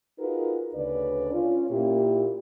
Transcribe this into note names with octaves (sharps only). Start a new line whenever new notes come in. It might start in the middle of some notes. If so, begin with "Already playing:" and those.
D#4 F4 F#4 G#4 A#4 B4
D2 C#3 C#4 D4 B4 D5
C#4 F4
A#2 A#3 E4 G4